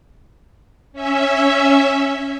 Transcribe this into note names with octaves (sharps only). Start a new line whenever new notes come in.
C#4 E5